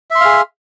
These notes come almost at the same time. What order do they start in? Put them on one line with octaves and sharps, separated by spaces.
E5 C6 F5 G#4